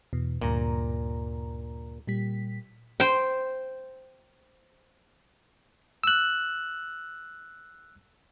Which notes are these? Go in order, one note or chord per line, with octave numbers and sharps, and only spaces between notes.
E2 B2
D2 G2 A#2 A#5
A#2 G3 B6
C5 G5
E6 F#6